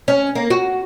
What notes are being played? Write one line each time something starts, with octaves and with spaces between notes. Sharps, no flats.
C#4
A#3
F#4